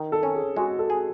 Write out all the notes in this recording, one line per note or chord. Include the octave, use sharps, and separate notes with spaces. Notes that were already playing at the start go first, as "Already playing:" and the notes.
Already playing: D#3
A4
C#4
G#4
G#3 F#4
A4
G#4